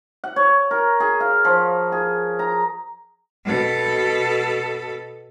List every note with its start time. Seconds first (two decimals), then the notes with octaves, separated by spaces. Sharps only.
0.24 F#5
0.36 C#5
0.71 A#4
1.00 G#4
1.20 F5
1.45 F3
1.92 G#4
2.39 A#5
3.45 B2 A4